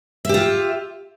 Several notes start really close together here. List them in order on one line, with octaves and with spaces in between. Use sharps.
E5 G4 F4